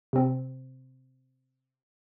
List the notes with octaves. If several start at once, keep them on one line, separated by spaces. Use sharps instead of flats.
C3 C4